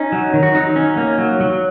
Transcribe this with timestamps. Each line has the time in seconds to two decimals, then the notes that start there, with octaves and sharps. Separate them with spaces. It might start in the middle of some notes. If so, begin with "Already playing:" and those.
Already playing: C#4 D#4
0.12 F#3
0.34 D#3
0.43 F#4
0.55 F#3 D#4
0.76 C#4
0.97 A#3
1.18 F#3
1.40 F#3